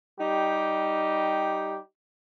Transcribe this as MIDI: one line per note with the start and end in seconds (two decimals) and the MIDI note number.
0.18 1.77 55
0.18 1.77 63
0.18 1.77 67